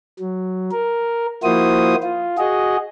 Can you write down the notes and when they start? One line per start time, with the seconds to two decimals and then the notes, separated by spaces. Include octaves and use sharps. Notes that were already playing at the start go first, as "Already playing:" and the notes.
0.20 F#3
0.71 A#4
1.43 F3 A#3 E4 F#4 C5 D#6
2.03 F4
2.38 F#4 G#4 D#5